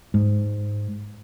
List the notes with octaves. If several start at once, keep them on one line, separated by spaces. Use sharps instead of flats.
G#2